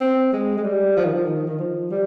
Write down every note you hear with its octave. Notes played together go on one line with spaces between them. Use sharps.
C4
G#3
G#3
G3
F3
D#3
F3
D#3
D#3
F3
G3